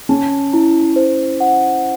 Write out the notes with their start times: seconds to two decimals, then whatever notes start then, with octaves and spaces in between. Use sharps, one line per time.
0.09 C#4 A5
0.53 E4
0.96 C5
1.40 F#5